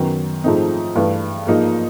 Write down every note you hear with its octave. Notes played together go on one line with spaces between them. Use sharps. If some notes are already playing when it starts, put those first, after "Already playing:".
Already playing: F#2 D#3 F#3 B3
G#2 F3 A3 C4 D#4
G2 E3 A3
G#2 F3 A#3 D#4